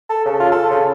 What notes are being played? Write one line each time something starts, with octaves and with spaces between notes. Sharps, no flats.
A4
C#3
F4
A4
C#3